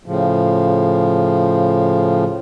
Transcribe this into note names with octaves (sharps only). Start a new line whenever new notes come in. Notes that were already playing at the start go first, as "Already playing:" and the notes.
A2 C#3 F3